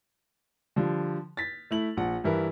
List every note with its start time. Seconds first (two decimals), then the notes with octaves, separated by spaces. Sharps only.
0.76 D3 F3 G3
1.37 A6 B6
1.71 A3 E4 F#7
1.97 A#1 F#5
2.24 G2 E3 E4 A#4